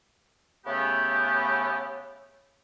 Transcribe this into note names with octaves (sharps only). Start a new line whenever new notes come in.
C#3 A3 B3 G4